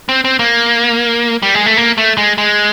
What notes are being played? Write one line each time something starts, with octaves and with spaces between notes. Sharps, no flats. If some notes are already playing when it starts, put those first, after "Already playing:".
C4
C4
A#3
G3
G#3
A3
A#3
A3
G#3
G#3